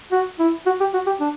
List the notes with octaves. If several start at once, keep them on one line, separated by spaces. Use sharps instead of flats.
F#4
E4
F#4
G4
F#4
G4
D4